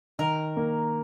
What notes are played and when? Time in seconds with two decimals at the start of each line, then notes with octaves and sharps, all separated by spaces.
0.19 D#3 A#4
0.57 A#3